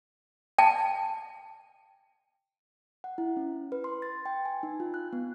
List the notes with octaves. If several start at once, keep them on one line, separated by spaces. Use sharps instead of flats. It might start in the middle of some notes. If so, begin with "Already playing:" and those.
G5 A5
F#5
E4
C#4
B4
C6
A6
G5
G#5
D#4
F4
F#6
B3